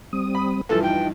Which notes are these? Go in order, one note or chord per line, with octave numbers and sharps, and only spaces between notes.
G3 C4 D#6
B5
G2 E3 F3 A4
D#4 G5